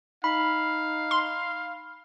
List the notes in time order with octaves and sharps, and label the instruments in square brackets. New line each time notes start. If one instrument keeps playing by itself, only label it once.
[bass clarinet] D#4 [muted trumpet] F5 [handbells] B5
[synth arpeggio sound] C6